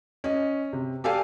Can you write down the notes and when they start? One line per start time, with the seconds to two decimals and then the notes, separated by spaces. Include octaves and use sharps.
0.24 C#4 D#5
0.73 C3
1.04 G4 A4 D5 F5 G#5